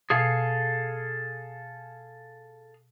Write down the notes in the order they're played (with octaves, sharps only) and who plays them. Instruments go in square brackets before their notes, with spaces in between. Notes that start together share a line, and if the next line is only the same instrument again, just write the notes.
[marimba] B2 [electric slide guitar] G#4 A4 F5